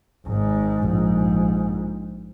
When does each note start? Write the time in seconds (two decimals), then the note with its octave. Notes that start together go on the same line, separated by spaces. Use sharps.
0.27 G#1 G#2
0.85 A#1 G#2